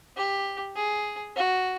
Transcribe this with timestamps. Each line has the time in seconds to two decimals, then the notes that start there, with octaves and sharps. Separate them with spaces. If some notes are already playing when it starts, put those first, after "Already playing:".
0.17 G4
0.76 G#4
1.36 F#4